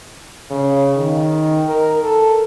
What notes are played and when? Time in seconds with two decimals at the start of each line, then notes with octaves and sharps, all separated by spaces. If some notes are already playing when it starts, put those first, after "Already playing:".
0.51 C#3
0.96 D#3
1.68 A#4
2.03 A4